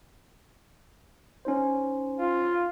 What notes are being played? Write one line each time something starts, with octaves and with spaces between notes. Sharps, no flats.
C#4 D#4 C5
F4